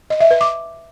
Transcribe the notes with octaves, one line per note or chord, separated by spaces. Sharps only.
D#5
E5
B4
D6